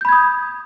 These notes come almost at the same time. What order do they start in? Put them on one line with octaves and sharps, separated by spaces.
G6 B5 G#6 D#6